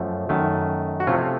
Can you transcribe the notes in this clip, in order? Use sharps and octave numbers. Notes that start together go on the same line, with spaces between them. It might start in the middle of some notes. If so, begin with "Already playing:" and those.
Already playing: F#2 F3 A3
F#2 D#3 A3
F#4
C3 F3 A3 C#4 F4